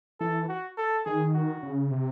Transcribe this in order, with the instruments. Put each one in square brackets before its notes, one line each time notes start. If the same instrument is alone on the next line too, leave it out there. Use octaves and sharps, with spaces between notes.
[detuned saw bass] E3 [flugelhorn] A4
[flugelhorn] F#4
A4
[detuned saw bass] D#3 [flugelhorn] G#4
[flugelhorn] F#4
[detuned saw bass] C#3
C3